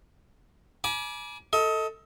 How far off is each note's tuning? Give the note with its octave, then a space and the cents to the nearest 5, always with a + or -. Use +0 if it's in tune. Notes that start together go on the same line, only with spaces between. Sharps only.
G#5 +35 B5 -40 D6 +0
A4 +10 D#5 +30